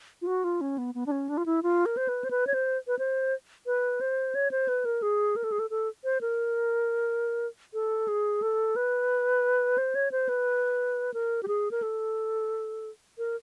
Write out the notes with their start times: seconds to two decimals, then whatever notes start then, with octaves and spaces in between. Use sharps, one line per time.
0.22 F4
0.27 F#4
0.44 F4
0.61 C#4
0.78 B3
0.95 B3
1.06 D4
1.11 C#4
1.29 D4
1.37 F4
1.46 E4
1.63 F4
1.86 A#4
1.97 C5
2.08 B4
2.24 C5
2.31 B4
2.47 C#5
2.54 C5
2.87 B4
2.99 C5
3.66 B4
4.01 C5
4.35 C#5
4.51 C5
4.68 B4
4.85 A#4
5.02 G#4
5.36 A#4
5.44 A4
5.52 G#4
5.59 A4
5.70 A4
6.04 C5
6.21 A#4
7.74 A4
8.08 G#4
8.42 A4
8.76 B4
9.78 C5
9.95 C#5
10.12 C5
10.29 B4
11.14 A#4
11.43 G4
11.48 G#4
11.71 A#4
11.82 A4
13.18 A#4